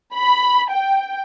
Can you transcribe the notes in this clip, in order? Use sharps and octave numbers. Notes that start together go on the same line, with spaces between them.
B5
G5